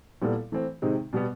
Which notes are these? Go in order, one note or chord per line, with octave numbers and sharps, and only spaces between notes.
A#2 G3 B3 E4 A4
E3 A3 C4
C3 D#3 G#3 C4 D#4
B2 G3 B3